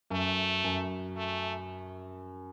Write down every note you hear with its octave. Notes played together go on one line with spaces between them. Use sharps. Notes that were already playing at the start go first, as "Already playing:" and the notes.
F#2 A3
F#2
A3